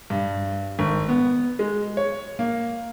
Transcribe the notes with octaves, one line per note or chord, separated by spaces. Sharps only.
G2
G#1
B3
G#3
C#5
A#3